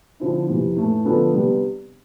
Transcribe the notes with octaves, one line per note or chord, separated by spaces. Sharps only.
D3 F3 C4 E4
F2 C3 E3
A2 E3 A3
D3 F3 B3 D4 A4
C3 G3 B3 D4 G4